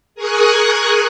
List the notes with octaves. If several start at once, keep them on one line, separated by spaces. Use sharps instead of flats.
G#4 A#4 G#5 C#6 D#6 F#6